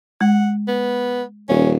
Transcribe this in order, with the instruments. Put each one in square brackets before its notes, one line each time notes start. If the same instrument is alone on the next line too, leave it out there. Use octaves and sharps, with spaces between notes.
[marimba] G#3 [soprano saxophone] F#5
[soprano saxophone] B3
[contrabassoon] D#1 [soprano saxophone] C#4